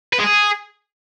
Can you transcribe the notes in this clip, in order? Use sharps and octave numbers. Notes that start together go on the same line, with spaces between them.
B4
G#3
G#4